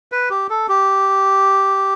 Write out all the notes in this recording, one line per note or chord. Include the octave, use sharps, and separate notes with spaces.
B4
G4
A4
G4